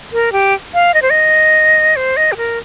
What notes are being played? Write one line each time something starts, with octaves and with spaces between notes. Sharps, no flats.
A#4
G4
F5
D#5
C5
D#5
C5
D#5
G4
A#4